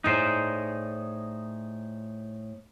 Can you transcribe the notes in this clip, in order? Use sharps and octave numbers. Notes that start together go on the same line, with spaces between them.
A2 D#4 G#4 C5 D5